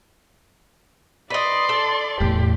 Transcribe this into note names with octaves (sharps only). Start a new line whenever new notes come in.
B4 D5 D#5 C6
A4
E2 A2 G4